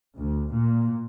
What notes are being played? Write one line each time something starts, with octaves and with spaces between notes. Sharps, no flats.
D2
A#2